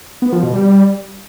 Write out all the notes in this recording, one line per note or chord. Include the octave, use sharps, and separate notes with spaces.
B3
F3
B2
G3